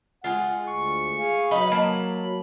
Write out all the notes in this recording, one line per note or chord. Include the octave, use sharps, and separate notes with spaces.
G#3 F4 F#5
D2 C#6
G#4 F5 G#5
F#3 D#4 B4 B5
A#3 A5 B5